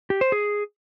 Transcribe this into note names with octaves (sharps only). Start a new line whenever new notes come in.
G4
C5
G#4